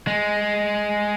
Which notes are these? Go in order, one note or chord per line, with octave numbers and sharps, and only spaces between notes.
G#3